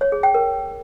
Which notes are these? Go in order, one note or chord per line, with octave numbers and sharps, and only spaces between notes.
C#5
G#4
G5
A#4